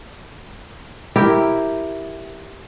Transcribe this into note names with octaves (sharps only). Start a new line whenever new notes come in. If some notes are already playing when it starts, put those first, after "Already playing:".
E4 G4 A#4